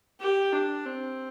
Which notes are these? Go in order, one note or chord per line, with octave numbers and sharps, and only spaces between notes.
G4
D4
C4